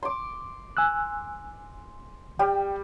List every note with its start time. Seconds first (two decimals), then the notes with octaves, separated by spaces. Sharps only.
0.03 C6 D6
0.77 G#5 E6 F#6
2.39 G3 G5